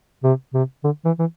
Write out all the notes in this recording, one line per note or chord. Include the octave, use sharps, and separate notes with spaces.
C3
C3
D3
E3
E3